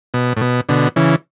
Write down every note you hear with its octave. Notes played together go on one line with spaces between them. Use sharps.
B2
A2
B2
B2 D3
C#3 E3